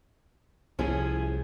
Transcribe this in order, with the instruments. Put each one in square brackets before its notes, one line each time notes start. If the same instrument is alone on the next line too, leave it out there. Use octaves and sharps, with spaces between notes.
[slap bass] C2 F3 [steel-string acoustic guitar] C#4 E4 G#4